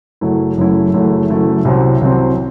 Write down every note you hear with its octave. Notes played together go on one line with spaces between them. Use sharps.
F#1 F#2 F#3 A3 E4
F#1 F#2 F#3 A3 E4
F#1 F#2 F#3 A3 E4
F#1 F#2 F#3 A3 E4
C2 C3 F#3 C4
C2 C3 F#3 C4